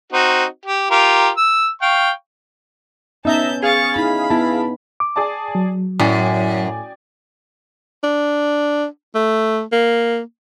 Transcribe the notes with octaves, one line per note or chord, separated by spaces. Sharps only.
C4 D#4 F#4
G4
F4 G4 A#4
E6
F5 G5 C#6
B3 C#4 D#4 E5 A5 A#5 G6
G#4 F5 C#6 A6
D#4 E4 B5
B3 E4 A5
D6
G#4 D5 A5
F#3
F#2 A2 D5 G5 G#5
D4
A3
A#3